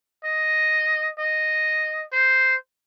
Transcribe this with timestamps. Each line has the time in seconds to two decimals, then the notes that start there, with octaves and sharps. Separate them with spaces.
0.25 D#5
1.19 D#5
2.13 C5